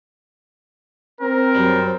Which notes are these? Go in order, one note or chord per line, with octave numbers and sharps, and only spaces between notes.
C4 A#4
F#2 G3